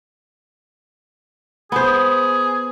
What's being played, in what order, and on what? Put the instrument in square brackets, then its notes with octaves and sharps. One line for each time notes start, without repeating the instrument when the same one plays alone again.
[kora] B3 C5 [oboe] G#4